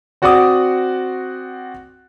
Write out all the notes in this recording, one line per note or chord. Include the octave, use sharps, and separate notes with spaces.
C4 F#4 D5 F#5 D6 D#6